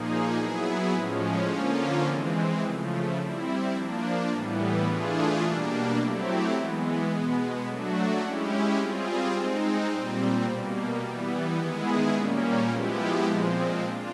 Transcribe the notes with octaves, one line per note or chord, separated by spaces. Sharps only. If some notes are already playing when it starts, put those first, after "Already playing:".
Already playing: A#2 F3 A#3 D#4 G#4
F#3 B3 E4 G#4
A2 F3 G#3 C#4
D3 F3 A#3 C#4 F4
E3 G#3 C4
C#3 F3 A3
G3 C4 E4
F3 A#3 D4
A2 E3 G3 B3
E3 A3 D4 F4 G#4
B2 G3 A#3 D4
F#3 A3 C4 E4 G4
E3 G#3 B3
B2 G#3 B3
F#3 A3 D4 F#4
G#3 C#4 E4 G4
G3 C4 F4 G#4
G#3 C4 D#4
A#2 G3 C4
B2 G3 A#3
E3 G3 B3
D#3 G#3 B3 E4 G#4
A#2 G3 A#3 C#4
F3 G#3 B3 E4 G4
A#2 F3 G#3 C4
D4 F4